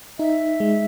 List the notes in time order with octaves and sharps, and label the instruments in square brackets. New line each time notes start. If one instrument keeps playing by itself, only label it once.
[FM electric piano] D#4 [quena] E5
[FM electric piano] G#3